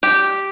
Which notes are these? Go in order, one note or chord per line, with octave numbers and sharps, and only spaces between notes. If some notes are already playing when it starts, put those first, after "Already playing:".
G4